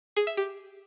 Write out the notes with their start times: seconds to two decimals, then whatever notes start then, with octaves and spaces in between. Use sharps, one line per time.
0.17 G#4
0.27 E5
0.37 G4